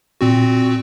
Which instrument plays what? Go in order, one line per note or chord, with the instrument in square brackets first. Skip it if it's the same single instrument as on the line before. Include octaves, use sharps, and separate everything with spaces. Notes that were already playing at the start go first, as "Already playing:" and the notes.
[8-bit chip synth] A#2 C4 F#4